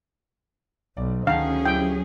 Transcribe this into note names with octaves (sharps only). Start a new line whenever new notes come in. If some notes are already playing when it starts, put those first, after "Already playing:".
B1 D5
D2 D#3 F#3 C#4 G#4 F5 F#5 A5
E4 G4 G5